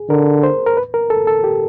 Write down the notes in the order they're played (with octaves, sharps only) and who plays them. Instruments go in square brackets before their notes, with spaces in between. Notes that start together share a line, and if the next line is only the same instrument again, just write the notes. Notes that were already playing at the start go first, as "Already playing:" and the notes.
Already playing: [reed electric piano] G#4
[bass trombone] D3 [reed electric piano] A#4
[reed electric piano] C5
A#4
B4
A#4
A4
A4
G4